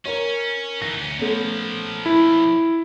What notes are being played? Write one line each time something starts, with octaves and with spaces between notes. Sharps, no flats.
C#4 A#4 C#5
E3 D#4 A#6
D2 C#4
A#2 F3 A3 B3 C#4
E4